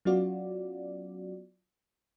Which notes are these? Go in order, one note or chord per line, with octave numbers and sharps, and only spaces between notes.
F#3 B3 C#4 F4 F#4 D5